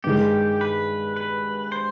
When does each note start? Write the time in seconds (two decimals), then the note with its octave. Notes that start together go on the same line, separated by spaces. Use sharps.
0.04 G2 D#3 G#3 G4
0.61 B4
1.16 B4
1.72 C5